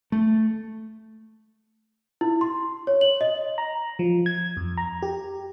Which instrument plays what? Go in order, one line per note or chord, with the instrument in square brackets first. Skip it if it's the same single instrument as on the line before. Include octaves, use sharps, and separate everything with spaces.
[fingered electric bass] A3
[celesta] E4
C6
C#5
F#7
D#5
[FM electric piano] A#5
F3
G#6
F2
A#5
G4